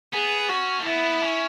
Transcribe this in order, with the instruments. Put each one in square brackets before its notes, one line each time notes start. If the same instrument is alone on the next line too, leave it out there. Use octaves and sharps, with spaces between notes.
[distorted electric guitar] B3 [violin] G#4
[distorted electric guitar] C#4 [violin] F#4
[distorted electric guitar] A3
[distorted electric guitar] B3 [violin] E4
[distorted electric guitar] C#4